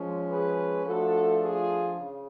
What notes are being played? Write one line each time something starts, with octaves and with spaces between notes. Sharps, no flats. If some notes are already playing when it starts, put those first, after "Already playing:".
Already playing: F3 G#3 C#4
G#4 B4
F3 A3 D4 F#4 A4
F4 G#4
C#3